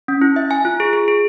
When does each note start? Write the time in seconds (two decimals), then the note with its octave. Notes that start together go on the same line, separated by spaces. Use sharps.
0.08 C#4
0.21 E4
0.36 E5
0.51 G#5
0.65 F4
0.80 G#4
0.93 G#4
1.08 G#4